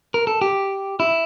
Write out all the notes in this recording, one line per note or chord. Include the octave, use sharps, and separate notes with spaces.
A#4
A4
G4
E4